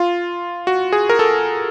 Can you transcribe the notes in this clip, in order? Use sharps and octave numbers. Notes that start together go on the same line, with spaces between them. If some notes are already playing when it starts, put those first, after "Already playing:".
Already playing: F4
F#4
G#4
A#4
A4